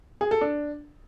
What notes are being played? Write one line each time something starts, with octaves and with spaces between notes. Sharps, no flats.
G#4
A4
D4